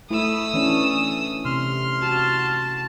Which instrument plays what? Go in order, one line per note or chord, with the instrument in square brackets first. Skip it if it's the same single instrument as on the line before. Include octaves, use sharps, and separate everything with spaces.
[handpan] A3 E4 [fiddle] D#6 E6
[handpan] E3 C#4 D4
[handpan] C3 [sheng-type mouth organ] C6 F6
[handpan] F#4 [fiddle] A5